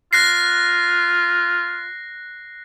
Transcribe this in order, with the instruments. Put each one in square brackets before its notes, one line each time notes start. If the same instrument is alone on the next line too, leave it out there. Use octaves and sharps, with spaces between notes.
[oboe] F4 [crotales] F#6 A#6 C7